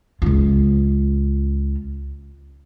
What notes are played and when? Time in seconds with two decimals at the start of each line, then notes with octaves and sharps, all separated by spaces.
0.22 C#2 F4